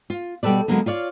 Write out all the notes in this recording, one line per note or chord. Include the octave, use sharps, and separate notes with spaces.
F4
B2 G3 G4 A4 B4 D5
D3 F#3 G#3 A#3 B3
F4 C#5 D5 F5